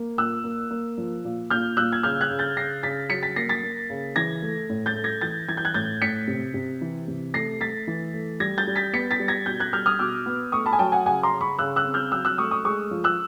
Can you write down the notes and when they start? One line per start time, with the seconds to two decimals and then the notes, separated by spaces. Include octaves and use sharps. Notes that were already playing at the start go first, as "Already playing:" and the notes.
Already playing: A#3
0.18 A#2 E6 F#6
0.44 A#3
0.71 A#3
0.98 F3
1.25 A#2
1.50 A#2 F6 G6
1.77 A#2 E6 F#6
1.92 G#6
2.03 C#3 F6 G6
2.21 F#6 G#6
2.30 C#3
2.39 G6 A6
2.56 C#3 A#6 C7
2.83 C#3 A6 B6
3.09 F#3 B6 C#7
3.23 A6 B6
3.36 A#3 A#6 C7
3.49 A6 B6
3.63 A#3
3.90 C#3
4.16 E3 G#6 A#6
4.42 A3
4.69 A2
4.86 G6 A6
4.95 A3
5.04 G#6 A#6
5.21 E3 G6 A6
5.48 E3 G#6
5.57 G6
5.65 F#6 G#6
5.74 A2 G6 A6
6.02 A2 B6 C#7
6.27 C3
6.54 C3
6.81 E3
7.08 C3
7.34 A3 A#6 C7
7.60 A3 A6 B6
7.87 E3
8.14 A3
8.40 G3 G#6 A#6
8.58 G6 A6
8.67 G3
8.76 A6 B6
8.93 B3 B6 C#7
9.11 A6 B6
9.20 G3
9.28 G#6 A#6
9.46 B2 G6 A6
9.60 F#6 G#6
9.73 G3 F6 G6
9.86 D#6 F6
9.99 B2 D6 E6
10.26 B3
10.52 A3 C#6 D#6
10.66 A5 B5
10.73 G#5
10.79 F#3 G5 A5
10.92 F#5 G#5
11.06 C#3 F#5 G#5
11.23 A#5 C6
11.32 C#3
11.41 B5 C#6
11.58 C#3 E6 F#6
11.76 E6 F#6
11.85 C4
11.94 F6 G6
12.12 F#3 E6 F#6
12.25 E6 F#6
12.38 A3 C#6 D#6
12.51 C#6 D#6
12.64 G#3 C#6 D#6
12.91 F3
13.04 E6 F#6